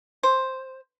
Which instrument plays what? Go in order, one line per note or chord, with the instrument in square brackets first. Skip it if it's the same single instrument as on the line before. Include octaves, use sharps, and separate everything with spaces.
[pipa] C5